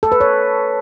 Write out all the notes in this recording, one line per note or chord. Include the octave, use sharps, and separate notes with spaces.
A4
B4
C#5